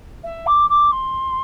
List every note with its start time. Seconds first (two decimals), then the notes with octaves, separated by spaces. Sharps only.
0.23 E5
0.46 D6
0.69 D6
0.91 C6